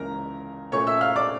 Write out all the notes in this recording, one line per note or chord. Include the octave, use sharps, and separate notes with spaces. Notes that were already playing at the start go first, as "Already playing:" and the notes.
Already playing: C#2 C#3 E3 A#3 A#4 A#5
A#2 A3 C#4 C#5 C#6
E5 E6
F5 F6
D5 D6